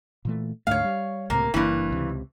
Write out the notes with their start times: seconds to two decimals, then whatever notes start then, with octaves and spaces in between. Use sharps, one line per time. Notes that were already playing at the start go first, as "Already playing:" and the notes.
0.25 A#2 E3 A3
0.67 D2 G#2 A3 C#5 F5
0.84 G3
1.30 C#2 A2 C3 A#3
1.54 F#1 G2 E3 A#3
1.91 C#2 C3